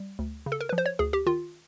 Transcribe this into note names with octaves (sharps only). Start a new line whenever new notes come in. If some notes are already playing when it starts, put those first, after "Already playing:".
Already playing: G3
D2
C#3
A4
A#4
F3 B4
C5
C#5
D2 G#4
G4
D#3 F4